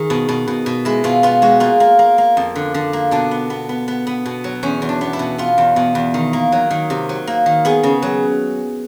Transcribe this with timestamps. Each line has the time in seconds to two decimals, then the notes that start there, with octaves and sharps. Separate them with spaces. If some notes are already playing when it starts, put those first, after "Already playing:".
Already playing: D#3 G#4
0.10 B2
0.29 B2
0.48 B2
0.66 B2
0.85 G#3 E4
1.04 B2 F4
1.23 B3 F4
1.42 G#3 F#4
1.60 A#3 F4
1.80 A#3
1.99 A#3
2.18 A#3
2.37 F2
2.56 D3
2.74 D3
2.93 A#3
3.11 B2 D4
3.31 B3
3.50 B3
3.69 B3
3.88 B3
4.07 B3
4.26 B2
4.44 F#3
4.63 E2 C#4
4.82 E2
4.89 D4
5.01 B3
5.13 E4
5.19 B2
5.38 B3 F4
5.58 E2
5.76 B2
5.95 E2
6.14 D#3
6.33 A#3
6.52 F#3
6.71 D#3
6.90 C3
7.09 F#3
7.27 A#3
7.46 D#3
7.65 B3 G#4
7.83 C#3
8.02 F#3